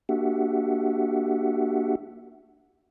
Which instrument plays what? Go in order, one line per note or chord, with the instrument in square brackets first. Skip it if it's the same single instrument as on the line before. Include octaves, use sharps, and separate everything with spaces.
[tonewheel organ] A#3 D4 F#4 G4 E5 F#5